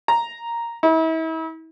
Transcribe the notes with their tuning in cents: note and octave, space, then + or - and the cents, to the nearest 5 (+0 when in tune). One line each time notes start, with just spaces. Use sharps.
A#5 +0
E4 -40